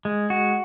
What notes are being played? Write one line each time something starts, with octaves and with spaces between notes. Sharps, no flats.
G#3
F#4